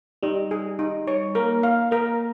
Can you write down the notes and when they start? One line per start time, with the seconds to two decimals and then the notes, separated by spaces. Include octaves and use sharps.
0.23 G3 D#4
0.51 G#4
0.79 D#4
1.07 C#5
1.35 A#3 A#4
1.63 F5
1.91 A#3 A#4